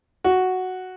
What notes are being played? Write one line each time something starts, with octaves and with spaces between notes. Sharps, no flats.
F#4